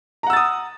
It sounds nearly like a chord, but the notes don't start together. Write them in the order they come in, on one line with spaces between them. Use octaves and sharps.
A#5 F#5 E6 A6 D#6